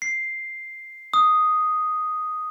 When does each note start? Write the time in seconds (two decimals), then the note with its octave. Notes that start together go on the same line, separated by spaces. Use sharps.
0.02 C7
1.14 D#6